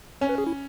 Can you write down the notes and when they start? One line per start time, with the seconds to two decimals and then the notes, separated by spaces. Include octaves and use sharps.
0.21 C#4 C#5
0.29 B4
0.38 G#4
0.47 E4